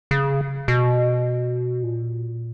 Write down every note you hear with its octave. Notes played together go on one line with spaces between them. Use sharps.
C#3
B2
A#2